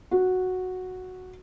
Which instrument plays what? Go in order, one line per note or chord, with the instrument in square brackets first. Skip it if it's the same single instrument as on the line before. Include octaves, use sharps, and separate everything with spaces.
[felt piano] F#4